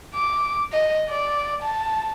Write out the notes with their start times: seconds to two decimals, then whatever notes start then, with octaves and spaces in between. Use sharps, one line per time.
0.15 D6
0.72 D#5
1.10 D5
1.63 A5